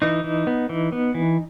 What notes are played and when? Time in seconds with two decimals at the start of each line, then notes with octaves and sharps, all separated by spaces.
0.02 E3 D#4
0.24 E3
0.47 B3
0.69 E3
0.92 B3
1.15 E3